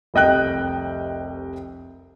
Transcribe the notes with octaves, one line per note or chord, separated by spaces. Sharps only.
F1 C2 D#5 G5 F#6